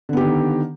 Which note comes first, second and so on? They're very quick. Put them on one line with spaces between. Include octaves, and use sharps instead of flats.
D3 B3 G4 D#3